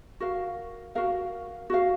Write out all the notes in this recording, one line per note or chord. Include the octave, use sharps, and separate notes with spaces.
F#4 A#4 F5
F#4 A#4 F5
F#4 A#4 F5